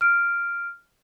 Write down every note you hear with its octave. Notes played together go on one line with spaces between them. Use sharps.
F6 D7